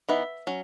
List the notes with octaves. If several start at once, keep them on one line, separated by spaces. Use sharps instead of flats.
E3 B3 D#4 E5
F#3 C#4